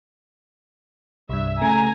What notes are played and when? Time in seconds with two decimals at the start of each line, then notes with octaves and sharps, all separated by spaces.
1.29 C2 G2 E5
1.62 C#3 A3 G#5 A#5